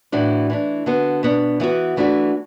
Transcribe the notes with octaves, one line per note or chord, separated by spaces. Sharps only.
A2 E3 D4 F#4
E3 A3 D4
D3 B3 F#4
B2 B3 D4
E3 B3 F#4
E3 A3 D4 F#4